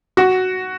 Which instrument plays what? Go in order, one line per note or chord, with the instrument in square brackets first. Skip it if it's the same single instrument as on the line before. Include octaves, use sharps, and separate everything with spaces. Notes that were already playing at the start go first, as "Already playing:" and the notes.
[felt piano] F#4